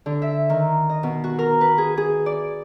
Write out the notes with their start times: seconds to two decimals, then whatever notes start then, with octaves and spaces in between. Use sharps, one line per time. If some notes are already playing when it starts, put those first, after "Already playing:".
0.06 D3
0.22 E5
0.50 D#3
0.90 D#5
1.03 B2
1.24 F#4
1.39 A#4
1.61 B4
1.78 G#4
1.97 G#4
2.26 D5